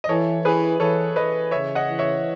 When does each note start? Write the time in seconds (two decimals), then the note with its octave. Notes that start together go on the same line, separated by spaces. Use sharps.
0.04 D#5
0.09 E3 A4 C#5
0.45 E3 G#4 B4
0.80 E3 A4 C#5
1.16 E3 B4 D#5
1.51 C#3 C#5 E5
1.75 D#5 F#5
1.87 E3
1.99 C#5 E5